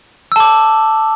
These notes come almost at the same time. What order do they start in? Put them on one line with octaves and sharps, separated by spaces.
E6 A5 D6